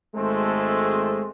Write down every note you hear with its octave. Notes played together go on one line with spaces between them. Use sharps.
G#1 G#3 A3 C4 A4